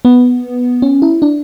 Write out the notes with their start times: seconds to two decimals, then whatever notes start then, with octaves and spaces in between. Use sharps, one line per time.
0.05 B3
0.82 C#4
1.02 E4
1.22 D4